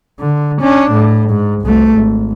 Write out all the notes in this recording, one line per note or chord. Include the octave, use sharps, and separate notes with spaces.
D3
C#4 D4
A2
G#2
C2 A3
G#1